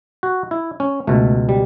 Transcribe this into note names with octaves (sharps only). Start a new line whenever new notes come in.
F#4
E4
C#4
C#2 B2 A3
G3